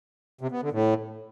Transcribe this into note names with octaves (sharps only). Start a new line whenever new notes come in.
C3
B3
D3
A2